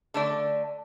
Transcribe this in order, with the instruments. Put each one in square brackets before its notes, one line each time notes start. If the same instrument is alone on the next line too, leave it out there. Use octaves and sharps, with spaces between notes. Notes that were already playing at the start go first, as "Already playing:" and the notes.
[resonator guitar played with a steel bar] D3 A3 D5